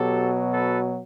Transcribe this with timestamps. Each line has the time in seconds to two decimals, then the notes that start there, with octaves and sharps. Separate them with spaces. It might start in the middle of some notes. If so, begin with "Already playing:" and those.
Already playing: B2 F#3 G4 A4
0.53 A4 B4